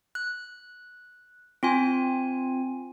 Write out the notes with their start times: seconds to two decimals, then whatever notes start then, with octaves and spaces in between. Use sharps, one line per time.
0.15 F#6
1.63 C4 F4 G#5